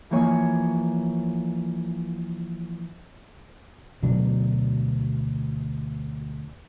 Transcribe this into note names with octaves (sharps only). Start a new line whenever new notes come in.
E3 F3 A#3 C#5 G#5 C#6
D2 B2 F#3 D4